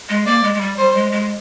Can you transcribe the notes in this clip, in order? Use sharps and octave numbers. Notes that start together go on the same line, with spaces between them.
G#3
A#3 D5
G#3
G#3
G3
G3 C5
G#3
G#3